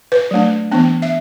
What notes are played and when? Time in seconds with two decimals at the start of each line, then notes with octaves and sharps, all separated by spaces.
0.12 B4
0.31 F#3 A3 D4
0.71 E3 B3 D4
1.02 E5